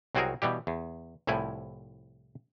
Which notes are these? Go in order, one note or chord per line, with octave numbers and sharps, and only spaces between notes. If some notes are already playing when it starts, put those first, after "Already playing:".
C2 F#3 C4 F#4 G#4 A#4
B2 E3 G3 G4
E2
C2 A2 F3 E4 G#5